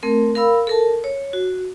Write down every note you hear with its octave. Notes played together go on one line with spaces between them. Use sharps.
A3 C4 A#4
A#4 F5 B5 E6
A4 A#4 A5
C#5
F#4